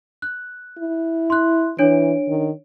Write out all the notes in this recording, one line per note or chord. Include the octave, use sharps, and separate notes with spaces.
F#6
E4
C6 F#6
E3 D4 C#5 D7
D#3